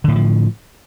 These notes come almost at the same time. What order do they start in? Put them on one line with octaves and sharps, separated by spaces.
D3 A2 E3 F3